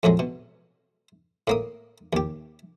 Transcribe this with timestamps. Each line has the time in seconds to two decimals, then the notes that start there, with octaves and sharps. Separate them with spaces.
0.03 F2 A2 F#3 G#3
0.19 B2
1.47 A2 A#3 D#6
2.13 D#2 G4